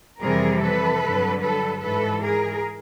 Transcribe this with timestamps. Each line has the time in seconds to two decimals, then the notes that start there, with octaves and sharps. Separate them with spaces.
0.22 F2 C3 E3 G3 G#4 A#4
0.62 A4 B4
1.02 G2 D3 F#3
1.42 A4 B4
1.82 G#2 E3 G3 A4 B4
2.22 G#4 A#4